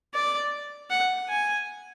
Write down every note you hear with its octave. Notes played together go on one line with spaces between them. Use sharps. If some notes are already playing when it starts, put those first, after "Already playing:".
D5
F#5
G#5